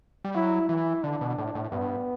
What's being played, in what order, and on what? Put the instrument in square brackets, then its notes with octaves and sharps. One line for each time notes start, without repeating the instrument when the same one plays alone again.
[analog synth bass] G3
[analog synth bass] F#3 [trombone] E4
[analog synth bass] E3 [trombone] E4
[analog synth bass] D3 [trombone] D4
[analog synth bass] B2
A2
A2
[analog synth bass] G2 [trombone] B3